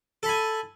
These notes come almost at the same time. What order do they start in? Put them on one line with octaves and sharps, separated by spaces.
A4 B5 G#5